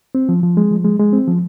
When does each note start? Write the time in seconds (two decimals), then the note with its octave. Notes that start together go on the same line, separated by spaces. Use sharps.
0.15 C4
0.29 F3
0.43 F3
0.57 G#3
0.71 F3
0.85 G#3
1.00 G#3
1.13 C4
1.28 F3